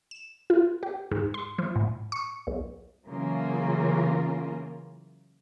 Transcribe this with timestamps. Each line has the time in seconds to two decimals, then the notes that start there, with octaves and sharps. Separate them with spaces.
0.11 E7
0.50 F4
0.83 G4
1.11 G#2
1.34 C6
1.58 F3
1.76 A2
2.12 C#6
2.47 B1
3.08 C#3 E3 F#3 A#3 F4 A#4